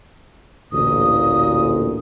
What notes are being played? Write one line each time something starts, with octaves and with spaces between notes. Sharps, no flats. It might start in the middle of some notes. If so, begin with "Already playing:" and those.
A1 D2 A#2 D#6